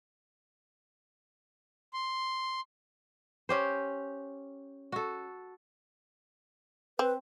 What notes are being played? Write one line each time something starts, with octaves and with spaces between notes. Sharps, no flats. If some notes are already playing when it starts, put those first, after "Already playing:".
C6
C#4 G4 C5
F#4 A4
C4 B4